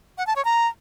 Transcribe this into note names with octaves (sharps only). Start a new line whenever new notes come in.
F#5
A5
C#5
A#5